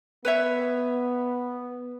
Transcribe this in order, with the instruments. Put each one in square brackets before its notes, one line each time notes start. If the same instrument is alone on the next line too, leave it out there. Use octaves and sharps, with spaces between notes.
[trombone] B3 [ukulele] B4 C#5 E5